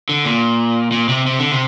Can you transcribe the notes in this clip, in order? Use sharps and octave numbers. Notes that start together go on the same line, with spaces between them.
D3
A#2
A#2
C3
C3
D3
C3